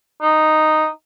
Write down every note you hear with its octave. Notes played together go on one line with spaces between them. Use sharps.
D#4